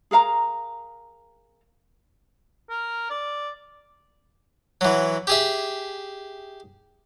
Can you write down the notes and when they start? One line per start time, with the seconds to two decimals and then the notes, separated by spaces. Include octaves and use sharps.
0.11 G#4 A#4 F5 A#5
2.70 A#4
3.10 D5
4.81 E3 F#3
5.27 G4 G#4 E5